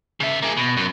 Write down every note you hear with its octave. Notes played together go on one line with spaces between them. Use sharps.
C#3 E5
A#3 G#4
B2
F#2